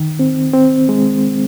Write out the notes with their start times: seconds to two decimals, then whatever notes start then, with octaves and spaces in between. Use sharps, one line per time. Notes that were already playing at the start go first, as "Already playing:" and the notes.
Already playing: D#3
0.19 C4
0.54 C4
0.89 G#3